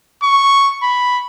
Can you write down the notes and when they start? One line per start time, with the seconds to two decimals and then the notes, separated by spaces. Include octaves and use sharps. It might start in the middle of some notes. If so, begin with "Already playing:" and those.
0.23 C#6
0.83 B5